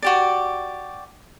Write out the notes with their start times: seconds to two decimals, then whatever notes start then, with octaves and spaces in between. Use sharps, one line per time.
0.02 F#4 G4 D5